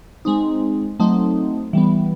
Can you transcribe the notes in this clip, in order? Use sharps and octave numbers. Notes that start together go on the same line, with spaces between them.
G#3 C4 D#4
F#3 A3 C4 D#4
E3 G3 B3